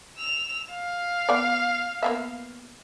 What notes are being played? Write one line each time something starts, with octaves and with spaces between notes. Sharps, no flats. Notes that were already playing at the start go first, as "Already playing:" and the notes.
E6 F7
F5
B3 D5
A#3 B3 E5